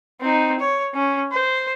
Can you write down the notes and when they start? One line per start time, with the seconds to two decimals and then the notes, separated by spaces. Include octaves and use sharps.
0.21 C4 D#4
0.60 C#5
0.94 C#4
1.32 C5